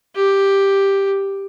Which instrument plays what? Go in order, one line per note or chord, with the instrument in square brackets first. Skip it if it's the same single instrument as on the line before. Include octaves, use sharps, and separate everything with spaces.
[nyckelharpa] G4